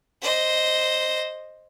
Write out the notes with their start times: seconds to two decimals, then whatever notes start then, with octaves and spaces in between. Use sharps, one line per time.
0.22 C5 D#5